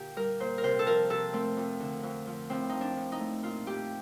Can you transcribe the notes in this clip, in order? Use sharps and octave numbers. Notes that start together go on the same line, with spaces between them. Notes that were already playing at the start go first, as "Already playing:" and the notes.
Already playing: A#2 D3 G4
G3 A#4
A#2 C5
A#4
C3 C5
A4
F3 A#4
C3 A4
A3 C4
F2
D3
F2
F3
A2 C4
F3 D#4
D4
A2
D#4
A3
A#2 F4
A3 G4